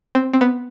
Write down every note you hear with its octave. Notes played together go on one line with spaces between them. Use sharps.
C4
C4
B3